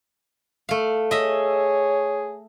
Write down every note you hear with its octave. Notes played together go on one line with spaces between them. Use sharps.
A3 F5
G#4 C#5 D#5 E5